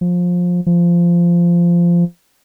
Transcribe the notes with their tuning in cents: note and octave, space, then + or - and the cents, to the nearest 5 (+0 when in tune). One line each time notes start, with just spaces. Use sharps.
F3 +20
F3 -15